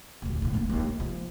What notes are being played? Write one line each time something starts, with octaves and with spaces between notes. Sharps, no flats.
D#1 D2
A2 D3
A#3 D4
D#2 F4
A#3
F3